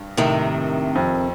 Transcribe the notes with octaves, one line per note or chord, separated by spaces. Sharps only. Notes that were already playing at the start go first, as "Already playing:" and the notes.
Already playing: G2
A2 C3 D#3
F2